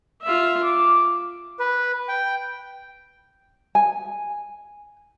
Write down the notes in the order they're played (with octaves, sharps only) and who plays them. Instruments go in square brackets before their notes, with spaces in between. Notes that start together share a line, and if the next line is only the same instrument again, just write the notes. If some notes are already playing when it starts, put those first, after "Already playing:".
[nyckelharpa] F4 E5
D6
[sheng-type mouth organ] B4
G5
[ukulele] G#5